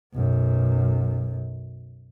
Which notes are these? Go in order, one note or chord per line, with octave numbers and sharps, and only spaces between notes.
B1 F#2